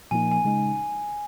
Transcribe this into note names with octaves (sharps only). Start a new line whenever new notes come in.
A#2 F3 A#3 D#4 G#5
G#5
C#3 G#3 D#4